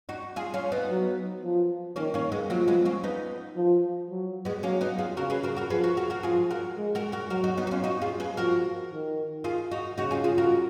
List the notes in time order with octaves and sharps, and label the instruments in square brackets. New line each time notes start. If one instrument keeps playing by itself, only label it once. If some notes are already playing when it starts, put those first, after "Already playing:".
[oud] D#4 F#4
F4 G#4
C#4 F4
B3 D#4
[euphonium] F#3
F3
[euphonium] D#3 [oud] A#3 C#4
[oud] A#3 C#4
G#3 B3
[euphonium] F3 [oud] F#3 A#3
[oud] G#3 B3
A#3 C#4
B3 D#4
[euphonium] F3
F#3
[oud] G#3 B3
[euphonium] F#3 [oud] A#3 C#4
[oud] B3 D#4
F4 G#4
[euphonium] C#3 [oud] F#4 A#4
[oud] G#4 B4
F#4 A#4
F#4 A#4
[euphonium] F3 [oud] G#4 B4
[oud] F#4 A#4
F#4 A#4
F#4 A#4
[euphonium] F3 [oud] F4 G#4
[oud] F#4 A#4
[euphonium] G#3
[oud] F#4 A#4
F#4 A#4
[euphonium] F#3 [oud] F#4 A#4
[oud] D#4 F#4
B3 D#4
F#4
C#4 F4
D#4 F#4
F4 G#4
G#4 B4
[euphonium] F3 [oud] F#4 A#4
[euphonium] D#3
[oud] F4 G#4
D#4 F#4
[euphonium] C#3 [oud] D#4 F#4
[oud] F4 G#4
F4 G#4
F#4 A#4